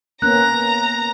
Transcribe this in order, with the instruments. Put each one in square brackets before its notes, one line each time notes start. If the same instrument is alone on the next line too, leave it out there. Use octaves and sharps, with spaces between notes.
[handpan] A#3 B3 C#4 [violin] A#5 [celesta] F#6